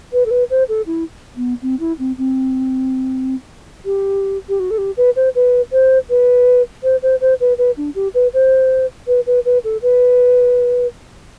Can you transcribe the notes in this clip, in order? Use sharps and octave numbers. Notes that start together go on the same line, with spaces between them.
B4
A4
B4
C5
A4
E4
B3
C4
E4
C4
C4
G4
G4
F#4
A4
G4
B4
C5
B4
C5
B4
C5
C5
C5
B4
B4
D4
G4
B4
C5
B4
B4
B4
A4
B4